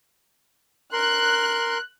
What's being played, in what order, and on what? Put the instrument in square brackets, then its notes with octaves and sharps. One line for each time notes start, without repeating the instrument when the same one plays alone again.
[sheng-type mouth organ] A#4 C6 [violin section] F#6